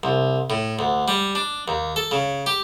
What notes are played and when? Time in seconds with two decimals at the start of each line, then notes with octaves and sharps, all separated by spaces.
0.03 C2
0.50 A2
0.79 D2
1.08 G3
1.35 D4
1.68 D#2
1.96 A4
2.11 C#3
2.46 G4